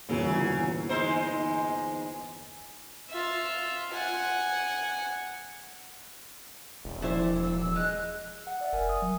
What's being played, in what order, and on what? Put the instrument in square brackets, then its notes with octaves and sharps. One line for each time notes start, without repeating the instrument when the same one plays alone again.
[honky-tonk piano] G1 E2 A#2 [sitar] C#3 F#3
[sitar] G#3 D#4 C5
[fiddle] F4 E5
F#5 G#5
[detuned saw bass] E1
[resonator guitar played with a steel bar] A#2 E4 C5 [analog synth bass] F3
[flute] E6
[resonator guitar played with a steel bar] G#3 [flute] F#6
[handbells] F#5
D5 E5
[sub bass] F#1 [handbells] A#4 G#5
[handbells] D#6
[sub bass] F#3